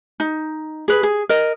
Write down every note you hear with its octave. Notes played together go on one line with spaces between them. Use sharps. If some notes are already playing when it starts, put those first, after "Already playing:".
D#4
G#4 B4
G#4
A#4 D#5